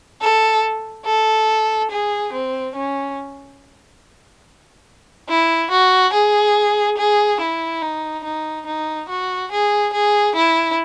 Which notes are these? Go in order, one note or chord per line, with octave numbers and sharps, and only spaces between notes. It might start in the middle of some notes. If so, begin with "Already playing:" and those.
A4
A4
G#4
C4
C#4
E4
F#4
G#4
G#4
E4
D#4
D#4
D#4
F#4
G#4
G#4
E4